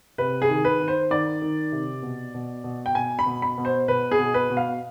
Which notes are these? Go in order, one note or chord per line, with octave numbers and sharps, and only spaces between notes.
C3 B4
G#4
D#3
B4
D#3
C5
D#3 D5
D#3
C3
B2
B2
B2
G5
B2 G#5
B5
B2
B5
B2
C5
B2 B4
G#4
B2
B4
B2
F5